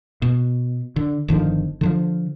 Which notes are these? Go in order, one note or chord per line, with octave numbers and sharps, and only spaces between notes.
B2
D3
G1 D3 D#3 F3
D3 D#3 F3